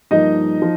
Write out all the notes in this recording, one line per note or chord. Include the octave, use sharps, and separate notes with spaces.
G2 F3 A#3 D#4 D#5
F3